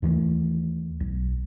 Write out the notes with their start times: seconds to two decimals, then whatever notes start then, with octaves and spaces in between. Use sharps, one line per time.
0.02 D#2 E3 G#3 A3
1.00 B1